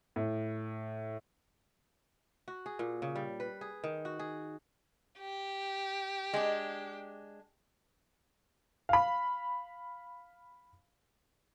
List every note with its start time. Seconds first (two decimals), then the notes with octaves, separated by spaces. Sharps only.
0.16 A2
2.48 F#4
2.66 G#4
2.79 A#2
3.02 C#3
3.16 G3
3.40 B4
3.61 G#4
3.84 D#3
4.05 F#4
4.19 G#4
5.18 G4
6.33 G#3 D4
8.89 F5 B5